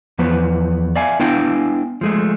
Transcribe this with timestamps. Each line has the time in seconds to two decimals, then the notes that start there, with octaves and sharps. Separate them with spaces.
0.19 E2 F3 B3 B4
0.96 D5 E5 F5 G#5
1.20 B3 D4 E4 F5 G5 G#5
2.01 F3 G#3 A3